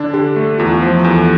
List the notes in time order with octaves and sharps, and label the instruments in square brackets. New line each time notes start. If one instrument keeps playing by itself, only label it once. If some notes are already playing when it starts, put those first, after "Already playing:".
Already playing: [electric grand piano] D3 D4
[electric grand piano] D3 [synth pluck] G4
[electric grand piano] A3
[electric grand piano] E2 [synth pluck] F4
[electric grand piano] F3
[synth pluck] A4
[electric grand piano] E2 [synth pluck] G4